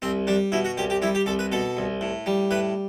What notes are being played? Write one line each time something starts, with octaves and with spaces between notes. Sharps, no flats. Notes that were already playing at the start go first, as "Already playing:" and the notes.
C2 C4
G3 D4
B2 E4
F#4
C2 G4
G4
G3 E4
G4
C2 A4
B4
B2 A4
C2
A2
G3
A2 B4